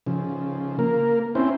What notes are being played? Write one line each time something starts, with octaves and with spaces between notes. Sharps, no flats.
C#3 F3
A#3 A#4
C4 C#4 E4 C5